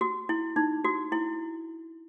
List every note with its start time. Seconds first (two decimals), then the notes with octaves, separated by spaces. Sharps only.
0.01 F#4
0.29 E4
0.56 D#4
0.84 F#4
1.12 E4